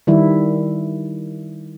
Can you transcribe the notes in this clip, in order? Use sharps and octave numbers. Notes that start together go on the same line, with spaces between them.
D#3 G3 E4